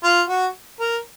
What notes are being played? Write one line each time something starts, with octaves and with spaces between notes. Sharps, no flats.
F4
F#4
A#4